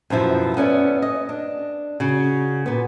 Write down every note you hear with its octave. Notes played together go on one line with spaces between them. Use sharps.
F#2 B2 F3 E4
B3 C#4 D5 E5
D#5
D4
C#3 F#4
A#2 B3